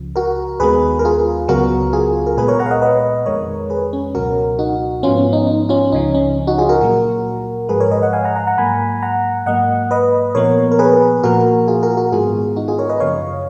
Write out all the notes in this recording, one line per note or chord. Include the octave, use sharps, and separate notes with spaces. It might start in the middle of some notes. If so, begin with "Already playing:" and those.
Already playing: C#2 C#3 F3
F#4 A#4
D#2 D#3 G#3 B3 G#4 B4
A#4
F4 G#4
C#2 C#3 F#3 B3 F#4 A#4
F4 G#4
A#4
A#2 G#3 B3 G#4 B4
A#4 C#5
F#5 A#5
F5
D#5 F#5
B4 D#5
F2 D#3 G#3 A#4 C#5
G#4 B4
C#4
C#2 B2 F#3 F#4 A#4
D#4 F#4
G#2 F3 B3 C#4 F4
C#4
D#4
D#4
C#4 F4
C#2 C#3 F3 D#4
C#4
D#4 F#4
F4 G#4
F#4 A#4
A#2 F#3 A#3
G#2 F3 G#3 G#4 B4
A#4 C#5
B4 D#5
D#5 F#5
F5 G#5
F#5 A#5
F#5 A#5
F#5 A#5
G#2 F#3 A#3 G#5 B5
F#5 A#5
G#2 F#3 A#3 D#5 F#5
B4 D#5
A#2 F3 B3 A#4 C#5
A#4
G#4 B4
A#2 F3 A#3 F#4 A#4
F4 G#4
F#4 A#4
F#4 A#4
G#2 D#3 G#3 B3 F4 G#4
D#4 F#4
F4 G#4
A#4 C#5
B4 D#5
F#2 C#3 F3 A#3 C#5 F5